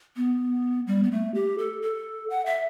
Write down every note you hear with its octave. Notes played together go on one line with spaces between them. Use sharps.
B3
G3
B3
A3
G4
A4
A4
F#5
E5